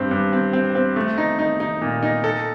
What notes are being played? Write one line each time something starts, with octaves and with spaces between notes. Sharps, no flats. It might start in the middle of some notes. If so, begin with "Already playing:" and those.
Already playing: G2 C4
G2
C4
C4
C4
A3
D#4
D#4
D#4
A#2
D#4
A4